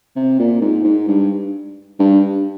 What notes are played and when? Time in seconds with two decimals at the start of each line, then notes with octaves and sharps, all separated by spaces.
0.15 C3
0.38 A#2
0.61 G#2
0.84 G#2
1.08 G2
1.99 G2